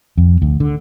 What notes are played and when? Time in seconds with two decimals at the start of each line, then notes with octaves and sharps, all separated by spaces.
0.18 F2
0.42 D2
0.60 D3